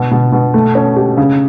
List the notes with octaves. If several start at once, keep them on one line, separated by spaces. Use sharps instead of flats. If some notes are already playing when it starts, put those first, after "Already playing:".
Already playing: B2
B2
B2
A3
C#4
G4
C#3